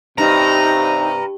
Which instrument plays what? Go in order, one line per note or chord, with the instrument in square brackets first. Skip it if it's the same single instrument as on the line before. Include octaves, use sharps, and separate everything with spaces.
[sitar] G2 [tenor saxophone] C3 [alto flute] D#4 [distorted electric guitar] A#5